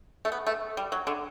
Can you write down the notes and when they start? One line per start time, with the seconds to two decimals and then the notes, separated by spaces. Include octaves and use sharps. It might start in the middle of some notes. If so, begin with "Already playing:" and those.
0.25 A3
0.32 B3
0.47 A3
0.77 G3
0.92 F#3
1.07 D3